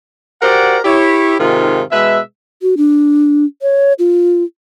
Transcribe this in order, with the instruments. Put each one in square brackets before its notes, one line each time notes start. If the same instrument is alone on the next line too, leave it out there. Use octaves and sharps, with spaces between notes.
[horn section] F#4 G4 A#4 C5 D5 F#5
E4 G4 C#5
G#2 C3 D#3 F4
B2 G#3 B4 E5
[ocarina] F#4
D4
C#5
F4